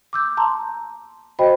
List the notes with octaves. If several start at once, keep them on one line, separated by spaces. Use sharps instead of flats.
D6 E6 G6
A5 A#5 C6
F#4 C5 D#5 G5 B5